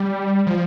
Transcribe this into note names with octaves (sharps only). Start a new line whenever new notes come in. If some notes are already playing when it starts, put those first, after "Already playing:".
Already playing: G3
F3